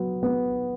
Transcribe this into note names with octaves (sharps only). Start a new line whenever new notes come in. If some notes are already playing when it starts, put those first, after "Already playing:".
Already playing: F#3 B3
B3